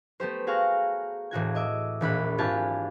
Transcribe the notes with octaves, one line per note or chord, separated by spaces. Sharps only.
A3 B3 G4 C5
F#4 G#4 F5 A#5 C#6
E1 A2 F#4 G#6
D#5 E5 D6
E1 A#1 B5 F#6
G#1 D4 F4 G4 G#5 A5